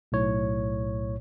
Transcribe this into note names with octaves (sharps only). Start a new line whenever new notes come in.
B1 A2 C#5